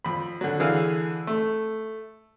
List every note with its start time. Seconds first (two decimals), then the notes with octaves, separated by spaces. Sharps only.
0.05 F2 B5
0.41 D3 F#3
0.60 D3 E3 G#4 F5
1.27 A3